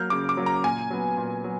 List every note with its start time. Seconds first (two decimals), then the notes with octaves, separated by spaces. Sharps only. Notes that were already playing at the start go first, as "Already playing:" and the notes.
Already playing: F#3 A#3 F6 G6
0.10 C#3 D6
0.29 D6
0.37 F#3 A#3
0.46 A#5
0.64 A#2 G#5
0.90 F#3 B3
1.17 A#2
1.44 F#3